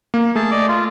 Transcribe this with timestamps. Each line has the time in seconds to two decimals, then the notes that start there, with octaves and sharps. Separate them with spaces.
0.14 A#3
0.35 A3 G#4 A5
0.51 D5 D#5 D6
0.68 F4